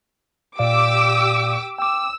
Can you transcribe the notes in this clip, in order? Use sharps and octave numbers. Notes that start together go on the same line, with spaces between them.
A#2 G4 D5 F5 D6 E6
G5 D6 E6